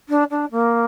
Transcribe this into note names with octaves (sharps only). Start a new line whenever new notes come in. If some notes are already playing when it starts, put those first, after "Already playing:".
D4
D4
A#3